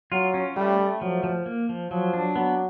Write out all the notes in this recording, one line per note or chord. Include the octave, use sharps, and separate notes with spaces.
F#3 F4
C#4
G3 A3
A3
F3 F#3
F3
A#3
F3
F3 F#3
D4
F#3 B3